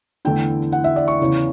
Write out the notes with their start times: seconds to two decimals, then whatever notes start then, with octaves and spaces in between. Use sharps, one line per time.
0.25 E2 D3 A3 E4 G5
0.73 F#5
0.84 E5
0.96 D5
1.08 C#6
1.20 E2 C#3 E3